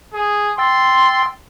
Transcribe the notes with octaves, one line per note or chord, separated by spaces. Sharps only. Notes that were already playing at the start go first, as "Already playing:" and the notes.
G#4
G5 C6 E6 A6